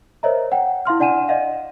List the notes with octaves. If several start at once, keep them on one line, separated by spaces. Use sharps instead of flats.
A#4 C5 C#5 D#5 E5 A#5
F#5 G5
E4 F5 C6 F6
D4 D5 F#5 G#5 D#7 E7
D5 D#5 F5 F#5